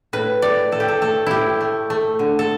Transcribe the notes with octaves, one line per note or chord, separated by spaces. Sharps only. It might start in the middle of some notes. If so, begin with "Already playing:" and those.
A2 B4
A2 D5
A2 A4
G4
A4
A3 A4
A2 E4 G4
A3
A3
D3
A4